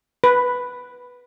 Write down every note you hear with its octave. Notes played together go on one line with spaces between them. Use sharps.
B4